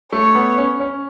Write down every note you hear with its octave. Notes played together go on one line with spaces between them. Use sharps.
A3 C#5
B3
C#4
C#4